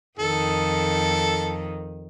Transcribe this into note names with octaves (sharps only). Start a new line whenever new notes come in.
F2 D#3 A4